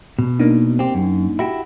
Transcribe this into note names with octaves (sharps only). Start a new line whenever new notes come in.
B2
A#3 D4 D#4
C4 G4
F#2
E4 F#4 G4